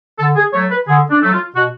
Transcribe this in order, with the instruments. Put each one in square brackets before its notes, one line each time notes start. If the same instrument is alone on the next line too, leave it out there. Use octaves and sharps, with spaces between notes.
[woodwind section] D3 A4
G#4
F#3 A3 C#5
B4
D3 G#4
D4
F#3 A3
F4
B2 F#4